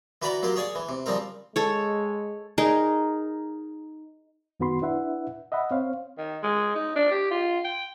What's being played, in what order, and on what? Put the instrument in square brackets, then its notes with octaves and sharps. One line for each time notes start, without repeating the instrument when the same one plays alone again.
[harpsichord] E3 F#4 B4 D5 A#5 B5
F#3 A#3 F4 G4
G#4 C#5 D5 G#5 D#6
E3
C3
C#3 F3 G3 C4 A#4
[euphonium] G#3 [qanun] A4 C#5
[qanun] D#4 G#4 A#4
[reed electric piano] F#2 D#3 B3 F#4 B5 C6
D4 E4 B4 E5 F#5
D#5 E5 F#5 B5
C4 C5 C#5 F5
[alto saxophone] D#3
G#3
D#4
D4
G4
F4
G5